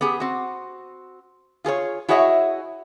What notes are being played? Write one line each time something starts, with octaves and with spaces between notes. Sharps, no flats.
B3 G4 G#4
C4 F#4
F4 G#4 A4 C#5
E4 F#4 G#4 C#5 D#5 E5